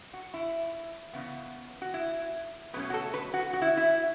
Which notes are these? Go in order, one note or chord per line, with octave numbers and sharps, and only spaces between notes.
F#4
E4
E2 C#3 B3
F#4
E4
B2 F#3 A3 C#4 B4
F#4
A4
B4
F#4
F#4
E4
E4